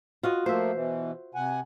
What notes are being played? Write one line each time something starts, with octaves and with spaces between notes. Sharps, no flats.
F4 F#4 D#5
F3 A3 A#3 C5 E5
B2 E3
C3 F#5 G#5